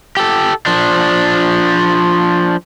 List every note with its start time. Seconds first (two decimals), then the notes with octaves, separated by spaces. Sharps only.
0.17 G4 A4
0.66 F3 D4